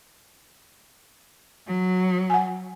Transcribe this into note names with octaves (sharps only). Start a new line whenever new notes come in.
F#3
F#5 G#5